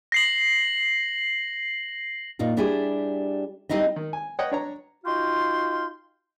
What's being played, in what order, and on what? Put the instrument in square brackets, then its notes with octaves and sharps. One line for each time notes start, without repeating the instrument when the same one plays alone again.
[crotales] A#6 C7 F#7
[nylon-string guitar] A#2 D#4 F4
G3 D4 E4 G4 G#4
G3 C4 D#4 E4 D#5
[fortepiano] D#3
G#5
B4 C#5 D#5 F#5 G5
D4 C#5 A#5
[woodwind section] D#4 F4 F#4 F5 G5 C6